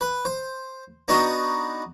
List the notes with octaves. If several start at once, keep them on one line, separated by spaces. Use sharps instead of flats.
B4
C5
B3 D4 D#4 F#4 D#5